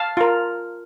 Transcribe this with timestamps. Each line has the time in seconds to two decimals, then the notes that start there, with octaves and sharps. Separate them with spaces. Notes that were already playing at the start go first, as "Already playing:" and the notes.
Already playing: F5 A5
0.17 F4 A#4